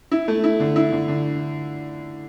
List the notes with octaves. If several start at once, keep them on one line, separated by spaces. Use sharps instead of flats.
E4
A3
E4
D3
E4
D3
D3